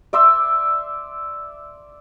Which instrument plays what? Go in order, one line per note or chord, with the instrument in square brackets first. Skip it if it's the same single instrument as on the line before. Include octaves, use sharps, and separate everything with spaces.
[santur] D5 E5 C6 E6